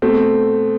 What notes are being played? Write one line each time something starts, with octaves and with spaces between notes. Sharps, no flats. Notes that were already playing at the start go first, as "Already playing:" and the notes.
B2 A3 C4